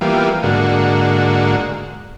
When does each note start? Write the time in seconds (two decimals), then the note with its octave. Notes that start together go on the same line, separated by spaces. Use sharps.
0.01 E3 G3 A#3 B3 F4
0.43 G#2 D3 A#3 F#4